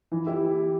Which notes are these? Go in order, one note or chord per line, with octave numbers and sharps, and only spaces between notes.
E3
E4 G4